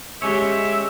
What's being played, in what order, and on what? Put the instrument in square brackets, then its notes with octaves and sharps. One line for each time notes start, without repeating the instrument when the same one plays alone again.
[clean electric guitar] G#3 C#4 C#5 [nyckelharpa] G4 [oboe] E5